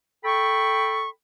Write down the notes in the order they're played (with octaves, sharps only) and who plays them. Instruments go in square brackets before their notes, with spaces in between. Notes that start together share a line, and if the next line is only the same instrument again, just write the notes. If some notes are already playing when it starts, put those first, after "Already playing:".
[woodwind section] A4 G5 B5 C#6